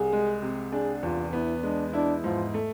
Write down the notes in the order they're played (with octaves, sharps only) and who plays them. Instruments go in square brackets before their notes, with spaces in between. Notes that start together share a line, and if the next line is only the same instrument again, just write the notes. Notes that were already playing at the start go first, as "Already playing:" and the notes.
Already playing: [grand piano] C2 [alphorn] G#4
[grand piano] G#3
C3
[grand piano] D4 [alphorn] G#4
[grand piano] E2 [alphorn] F4
[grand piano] B3 [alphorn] E4
[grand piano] G#3 [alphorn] D4
[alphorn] D4 [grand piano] E4
[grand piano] G#2 [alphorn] F3
[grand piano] A3